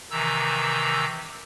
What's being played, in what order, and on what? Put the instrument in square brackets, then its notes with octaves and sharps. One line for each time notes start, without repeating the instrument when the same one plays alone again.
[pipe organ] C3 D#3 E3 A#5 E6